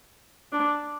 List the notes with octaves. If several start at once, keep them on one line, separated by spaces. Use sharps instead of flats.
D4